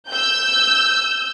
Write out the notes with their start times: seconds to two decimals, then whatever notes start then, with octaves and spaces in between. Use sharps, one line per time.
0.11 E6 G6